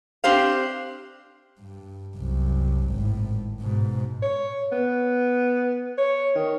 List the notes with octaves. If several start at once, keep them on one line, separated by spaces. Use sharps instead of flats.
C4 D4 G4 C5 F5
G2
C2 F#2
G#1 A2
G#2 B2
C#5
B3
C#5
D#3